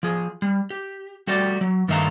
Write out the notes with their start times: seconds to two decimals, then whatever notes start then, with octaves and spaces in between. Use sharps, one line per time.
0.03 F3 G#4
0.42 G3
0.70 G4
1.27 G3 A3 F#4 G4 D5
1.61 F#3
1.88 G2 D#3 A3 E5 F5 A#5